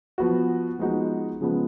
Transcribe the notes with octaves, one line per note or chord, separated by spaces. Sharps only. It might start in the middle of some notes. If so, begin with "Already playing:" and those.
F3 B3 F#4
F3 G#3 B3 D#4 F#4
C#3 F3 G#3 B3